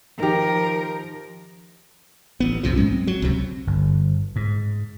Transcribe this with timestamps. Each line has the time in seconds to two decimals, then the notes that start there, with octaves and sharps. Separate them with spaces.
0.20 D#3 F3 G4 A#4
2.40 A1 B3
2.63 B1 F2 C3 F3
2.76 G#2 F#3 G#3 C#4
2.92 C4
3.07 F#3
3.22 C#2 C3
3.67 G1
4.36 G#2